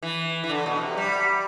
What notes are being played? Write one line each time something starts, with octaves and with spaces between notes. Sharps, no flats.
E3
E3
D3
B2
C3
G3